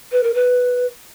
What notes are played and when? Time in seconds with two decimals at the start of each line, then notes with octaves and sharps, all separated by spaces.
0.12 B4
0.23 A#4
0.34 B4